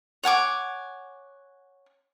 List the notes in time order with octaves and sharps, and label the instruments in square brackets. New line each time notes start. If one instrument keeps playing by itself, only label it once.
[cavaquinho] C#5 F#5 G#5 D6